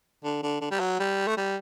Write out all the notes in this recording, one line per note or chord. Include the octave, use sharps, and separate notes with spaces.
D3
D3
D3
G3
F#3
G3
A3
G3